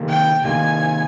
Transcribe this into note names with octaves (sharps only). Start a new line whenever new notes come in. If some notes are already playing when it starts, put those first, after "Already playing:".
Already playing: C3 D#3 A#3
G5
C3 D#3 A#3 G#5